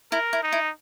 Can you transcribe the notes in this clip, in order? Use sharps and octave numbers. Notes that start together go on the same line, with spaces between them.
E4 A#4
E4
D#4
E4